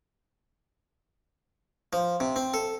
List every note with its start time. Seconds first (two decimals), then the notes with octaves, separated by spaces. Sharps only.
1.93 F3
2.20 C3
2.36 C4
2.54 A4